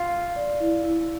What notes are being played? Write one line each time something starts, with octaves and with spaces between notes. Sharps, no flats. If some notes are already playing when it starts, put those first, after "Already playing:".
Already playing: F4
F5
D5
E4
E4